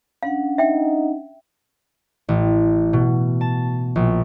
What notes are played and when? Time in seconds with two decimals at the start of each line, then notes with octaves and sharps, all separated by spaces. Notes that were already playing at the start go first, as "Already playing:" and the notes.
0.23 C#4 D4 F5 F#5
0.58 D#4 E5 G5
2.29 A1
2.93 B2
3.41 A5
3.96 A#1